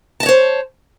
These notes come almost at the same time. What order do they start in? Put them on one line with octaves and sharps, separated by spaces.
A5 D#5 C#5 C5